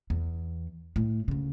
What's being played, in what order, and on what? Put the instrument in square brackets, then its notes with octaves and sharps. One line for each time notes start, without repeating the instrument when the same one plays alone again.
[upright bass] E2
A2
D2 C#3